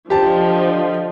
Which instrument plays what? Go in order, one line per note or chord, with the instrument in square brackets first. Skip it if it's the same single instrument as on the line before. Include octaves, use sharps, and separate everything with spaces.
[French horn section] D3 D4 D#5 [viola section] F3 [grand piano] G4 A5